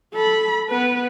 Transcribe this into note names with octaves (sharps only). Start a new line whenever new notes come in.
A4 B5
B3 B4